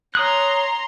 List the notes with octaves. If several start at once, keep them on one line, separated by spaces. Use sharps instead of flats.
C#5 A#5 C6 D#6 F#6